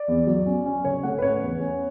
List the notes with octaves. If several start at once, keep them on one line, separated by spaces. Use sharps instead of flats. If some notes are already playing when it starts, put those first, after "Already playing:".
Already playing: D5
E2
F#3
C#4
C#4
C#3 C#5
A3 F#5
B4
C#4 C#5
E2
C#4